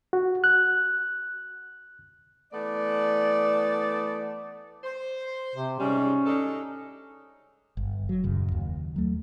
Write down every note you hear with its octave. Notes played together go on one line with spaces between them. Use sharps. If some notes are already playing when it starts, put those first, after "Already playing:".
F#4
F#6
E3 A3 B3 D5
C5
C3
G#2 G3 C#4
D4 D#4 A4
G1
F#3
D#1 F#2 C#3
D#2
F#3 A3